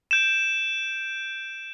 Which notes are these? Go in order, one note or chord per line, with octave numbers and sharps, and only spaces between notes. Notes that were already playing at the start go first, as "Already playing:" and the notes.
G6 D7 E7